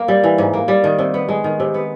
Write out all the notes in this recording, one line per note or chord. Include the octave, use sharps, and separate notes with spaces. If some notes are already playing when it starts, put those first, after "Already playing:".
Already playing: A#3
G3
E3
G#2
A#3
G3
D#3
C3
B3
G#3
D#3
C3
B3